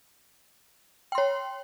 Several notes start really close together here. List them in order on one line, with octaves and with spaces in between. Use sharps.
G5 C6 C#5